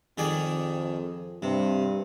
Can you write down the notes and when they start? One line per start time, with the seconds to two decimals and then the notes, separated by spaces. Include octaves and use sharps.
0.18 F2 D#3 G#4 D5
1.42 G2 C3